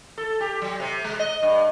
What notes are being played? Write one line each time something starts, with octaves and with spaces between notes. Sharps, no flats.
A4
G4
F#3
C3
G#3
D#5
G2